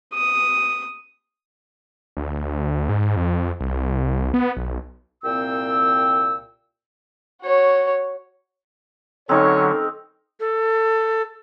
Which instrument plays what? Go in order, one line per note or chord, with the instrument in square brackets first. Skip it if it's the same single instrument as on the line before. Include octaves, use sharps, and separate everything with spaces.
[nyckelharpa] D#6
[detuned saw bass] D2
G#2
F2
C2
B3
B1
[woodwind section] C2 A#2 C4 G5 E6
[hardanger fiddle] F#4 C#5
[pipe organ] D3 F#3 C#4 [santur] C4 D#4 A#4 [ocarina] A4 [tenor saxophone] C#5
[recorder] A4